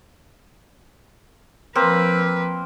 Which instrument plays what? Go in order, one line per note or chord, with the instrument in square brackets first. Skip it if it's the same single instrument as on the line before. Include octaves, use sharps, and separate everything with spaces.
[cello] F3 B4 [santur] A#3 C4